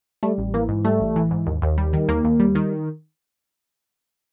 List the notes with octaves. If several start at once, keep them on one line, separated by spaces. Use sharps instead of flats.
G3 A3
A1
E3 A#3
G#2
G3 A3
A1
E3
G#2
D#2
D#2
G3
D#3
D#2 A#3
D#2
G3
D#3